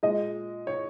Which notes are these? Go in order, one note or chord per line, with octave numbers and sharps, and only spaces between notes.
A#2 G#3 D#5
C#5